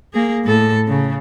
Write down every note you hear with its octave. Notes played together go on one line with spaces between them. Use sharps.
A#3 G#4
A2 A4
C#3